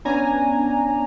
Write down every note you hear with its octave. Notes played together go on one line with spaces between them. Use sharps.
B3 C#4 D4 G#5 A#5